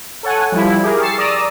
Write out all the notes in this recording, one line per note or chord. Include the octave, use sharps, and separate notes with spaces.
A4 C#5 F#5 G#5
F3 G3 E4
G4 G#4 A#4
C#6 E6 A6 C7
D5 A#5 D#6 E6 A#6